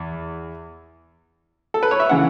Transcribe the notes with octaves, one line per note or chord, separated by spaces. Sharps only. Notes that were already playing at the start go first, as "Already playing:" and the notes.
Already playing: E2
A4
B4
C#5
E5
C#3 E3 F#5